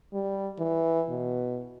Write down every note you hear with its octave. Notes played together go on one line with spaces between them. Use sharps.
G3
E3
B2